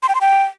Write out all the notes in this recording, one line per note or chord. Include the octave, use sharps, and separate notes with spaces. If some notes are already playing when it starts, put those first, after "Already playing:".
C6
G5
C6
G5